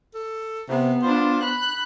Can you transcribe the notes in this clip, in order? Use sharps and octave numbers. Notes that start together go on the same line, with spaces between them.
A4
C3 B3
D4 F4 C5
B5 F#6